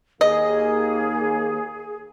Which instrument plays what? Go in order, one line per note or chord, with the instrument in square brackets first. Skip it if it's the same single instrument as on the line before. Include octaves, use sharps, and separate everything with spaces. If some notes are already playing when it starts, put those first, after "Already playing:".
[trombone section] D#2 A#3 [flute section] G#4 [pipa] D#5